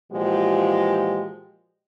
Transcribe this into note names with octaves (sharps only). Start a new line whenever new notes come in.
A#2 E3 F3 G#3 F#4 G4